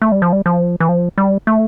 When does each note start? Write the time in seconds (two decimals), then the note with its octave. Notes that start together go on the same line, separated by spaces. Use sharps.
0.02 A3
0.12 G3
0.22 F3
0.32 G3
0.46 F3
0.80 E3
0.89 F3
1.18 G3
1.47 A3